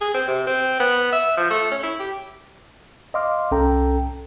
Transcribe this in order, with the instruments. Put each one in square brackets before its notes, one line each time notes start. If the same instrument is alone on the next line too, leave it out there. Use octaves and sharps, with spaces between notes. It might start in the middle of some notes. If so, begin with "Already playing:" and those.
[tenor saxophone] G#4
C4
C3
C4
B3
E5
F3
A3
C#4
E4
G4
[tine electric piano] D#5 F5 C6 D6 F6
C2 C#4 A4 G5 A#5